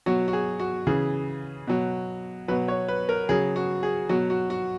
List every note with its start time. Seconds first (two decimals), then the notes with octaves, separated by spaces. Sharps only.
0.06 B2 F#3 F#4
0.28 F#4
0.33 G#4
0.60 F#4
0.87 C#3 E3 G#4
1.67 B2 F#3
2.48 F#3 B4
2.51 B2
2.68 C#5
2.88 B4
3.09 A#4
3.29 C#3 F#3 G#4
3.56 F#4
3.83 G#4
4.09 B2 F#3 F#4
4.30 F#4
4.50 F#4